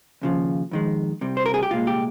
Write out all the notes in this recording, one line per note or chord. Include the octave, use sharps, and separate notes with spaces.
D#2 C#3 F3
F2 D#3 G#3
C2 C3 G3
C5
A#4
G#4
G4
C2 A#2 G#3 F4
G4